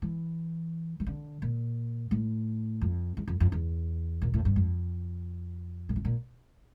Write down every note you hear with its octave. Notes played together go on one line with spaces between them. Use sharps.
E3
E3
D3
A#2
A2
F2
E2
F2
F2
E2
A#2
A2
G2
F2
A#2
A2
A#2